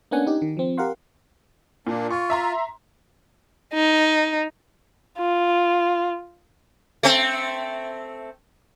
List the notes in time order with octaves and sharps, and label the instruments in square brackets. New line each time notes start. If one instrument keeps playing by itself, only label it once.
[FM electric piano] A#3 B3 C#4 D4 F#5 G#5
D#4 G4
D#3
F3 C4
G4 A#4 F5 F#5 C6
[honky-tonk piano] A#2 [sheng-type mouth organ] A#3 D4
[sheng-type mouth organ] F4 [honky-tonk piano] C#6
[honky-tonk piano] E5 A#5 C6
[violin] D#4
[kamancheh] F4
[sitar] A3 C4